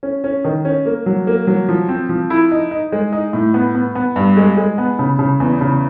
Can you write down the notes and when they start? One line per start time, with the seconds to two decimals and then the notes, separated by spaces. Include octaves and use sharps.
0.03 C#4
0.24 C#4
0.45 D#3
0.65 C#4
0.85 A#3
1.06 F#3
1.27 A#3
1.47 F#3
1.68 F3
1.88 C4
2.09 F3
2.30 E4
2.51 D#4
2.71 D#4
2.92 G#3
3.12 D#4
3.33 A2
3.54 B3
3.74 B3
3.95 B3
4.16 G2
4.37 G#3
4.57 G#3
4.78 B3
4.99 C#3
5.19 C#3
5.40 E2
5.61 C#3